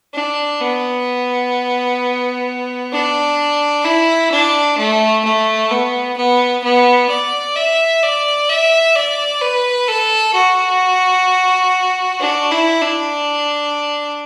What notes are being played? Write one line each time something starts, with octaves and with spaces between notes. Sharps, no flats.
D4
B3
D4
E4
D4
A3
A3
B3
B3
B3
D5
E5
D5
E5
D5
B4
A4
F#4
D4
E4
D4